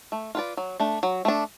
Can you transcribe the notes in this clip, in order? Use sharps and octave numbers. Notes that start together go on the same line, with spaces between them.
A3
F4 B4 D5
F#3
A3 D4
F#3
A3 D4